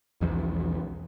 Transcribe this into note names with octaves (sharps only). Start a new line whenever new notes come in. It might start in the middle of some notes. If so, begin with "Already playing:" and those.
B1 E2 F3